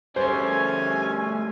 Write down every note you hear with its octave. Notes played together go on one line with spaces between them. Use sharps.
G3 A3 C#4 C5 G#5